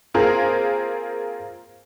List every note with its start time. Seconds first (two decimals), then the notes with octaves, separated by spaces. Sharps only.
0.14 A#3 C4 F4 G#4 A#4 C5